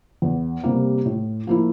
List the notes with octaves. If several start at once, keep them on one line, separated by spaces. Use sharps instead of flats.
E2
C3 G3 A#3
A2
F3 A#3 E4